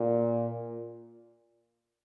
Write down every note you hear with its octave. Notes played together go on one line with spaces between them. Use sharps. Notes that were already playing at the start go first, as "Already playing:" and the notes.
Already playing: A#2